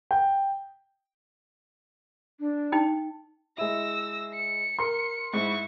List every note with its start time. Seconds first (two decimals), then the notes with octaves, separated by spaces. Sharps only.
0.11 G5
2.40 D4
2.72 D#4 G5
3.58 G#3 E4 E6 A#6
4.33 C#7
4.79 A#4 C6
5.34 G#2 E4 C#6